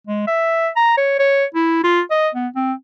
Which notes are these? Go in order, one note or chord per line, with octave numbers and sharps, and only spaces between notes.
G#3
E5
A#5
C#5
C#5
E4
F4
D#5
B3
C4